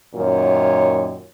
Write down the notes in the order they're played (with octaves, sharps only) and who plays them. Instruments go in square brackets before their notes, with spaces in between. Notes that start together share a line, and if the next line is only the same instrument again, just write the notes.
[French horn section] F#2 A#2 D#3 C#5